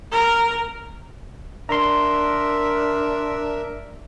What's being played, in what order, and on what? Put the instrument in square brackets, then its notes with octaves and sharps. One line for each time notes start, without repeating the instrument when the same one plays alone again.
[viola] A#4
[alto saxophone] D4 [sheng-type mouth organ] A#4 E5 [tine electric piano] A#5 C6